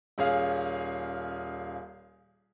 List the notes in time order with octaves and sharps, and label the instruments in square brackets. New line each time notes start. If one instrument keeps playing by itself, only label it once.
[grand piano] D#1 C#4 G#4 F5